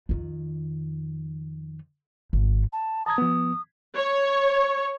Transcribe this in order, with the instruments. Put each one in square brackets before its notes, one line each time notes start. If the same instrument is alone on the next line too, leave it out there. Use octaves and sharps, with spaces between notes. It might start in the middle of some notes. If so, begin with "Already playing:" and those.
[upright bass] F2 D#3
G#1
[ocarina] A5
[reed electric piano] A5 A#5 G#6 [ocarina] D#6
[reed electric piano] F3 B3
[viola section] C#5